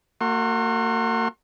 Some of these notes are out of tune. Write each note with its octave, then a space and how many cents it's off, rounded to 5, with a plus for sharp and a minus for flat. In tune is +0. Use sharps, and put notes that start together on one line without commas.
A#3 -40 F#4 +0 C6 +40